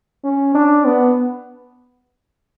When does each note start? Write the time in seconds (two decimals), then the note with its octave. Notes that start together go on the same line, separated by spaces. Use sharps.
0.24 C#4
0.55 D4
0.85 B3